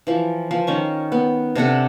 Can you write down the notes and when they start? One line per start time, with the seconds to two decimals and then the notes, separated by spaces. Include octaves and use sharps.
0.07 E3 F3
0.51 F3
0.67 D#3 C#4 C#6
1.12 B3
1.55 C3 D4 A4 F#5